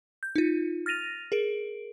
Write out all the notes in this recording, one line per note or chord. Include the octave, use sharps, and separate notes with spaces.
G6
D#4 F4
F6 A6 A#6 D#7 F7
G#4 A#4 D7